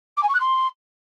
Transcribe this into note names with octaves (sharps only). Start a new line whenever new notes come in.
D6
G#5
C#6
F#6
C6